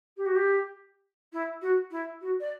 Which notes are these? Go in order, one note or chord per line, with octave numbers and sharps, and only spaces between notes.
G4
F#4
G4
E4
F#4
E4
F#4
D5